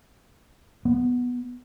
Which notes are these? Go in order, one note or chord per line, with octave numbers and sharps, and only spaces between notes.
B3